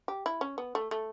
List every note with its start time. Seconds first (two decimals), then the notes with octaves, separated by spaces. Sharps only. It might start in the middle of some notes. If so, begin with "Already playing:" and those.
0.08 G4
0.26 E4
0.41 C#4
0.58 B3
0.75 A3
0.91 A3